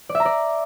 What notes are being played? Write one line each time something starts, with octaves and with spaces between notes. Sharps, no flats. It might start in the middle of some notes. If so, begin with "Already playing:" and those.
D5
E5
A#5
D5